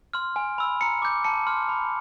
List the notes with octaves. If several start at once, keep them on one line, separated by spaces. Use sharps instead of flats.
C6 F6
G#5
B5 E6
A#5 C#7
D6 G6
A5 C#7
C6 F6
B5